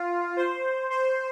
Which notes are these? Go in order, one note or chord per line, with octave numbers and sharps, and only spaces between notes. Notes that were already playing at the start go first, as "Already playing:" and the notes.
Already playing: F4
C5
C5